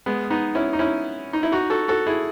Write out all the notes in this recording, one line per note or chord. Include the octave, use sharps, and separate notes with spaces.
G#3 B3
B3 D#4
C#4 E4
D#4
C#4 E4
D#4
E4
D#4 F#4
F#4 A4
F#4 A4
E4 G#4